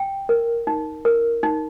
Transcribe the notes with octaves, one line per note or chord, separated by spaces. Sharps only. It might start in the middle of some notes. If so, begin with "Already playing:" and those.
Already playing: G5
A#4
D#4
A#4
D#4